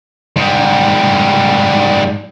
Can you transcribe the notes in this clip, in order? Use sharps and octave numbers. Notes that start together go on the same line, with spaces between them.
G#2 G3